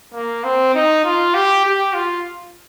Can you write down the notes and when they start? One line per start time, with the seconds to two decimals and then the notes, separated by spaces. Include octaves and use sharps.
0.14 A#3
0.44 C4
0.75 D#4
1.05 F4
1.34 G4
1.65 G4
1.94 F4